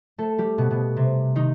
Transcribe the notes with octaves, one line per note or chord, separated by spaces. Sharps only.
A3 A4
G3 G4
B2 B3
B2 B3
C3 C4
D#3 D#4